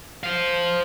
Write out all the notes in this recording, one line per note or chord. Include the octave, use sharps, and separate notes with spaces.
C5 F5